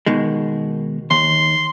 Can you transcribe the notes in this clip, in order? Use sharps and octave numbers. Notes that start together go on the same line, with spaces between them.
B2 D#3 G#3
D#2 C6